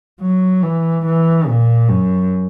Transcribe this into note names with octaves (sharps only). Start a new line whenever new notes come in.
F#3
E3
E3
A#2
F#2